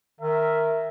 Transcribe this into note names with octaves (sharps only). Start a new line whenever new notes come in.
D#3 A#4 E5